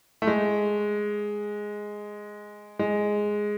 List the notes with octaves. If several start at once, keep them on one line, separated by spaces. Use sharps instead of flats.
A3
G#3
G#3